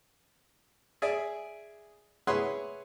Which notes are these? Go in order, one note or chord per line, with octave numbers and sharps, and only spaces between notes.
G#4 D5 E5 G#5
E4 G#4 B4 C#5 F#5 C6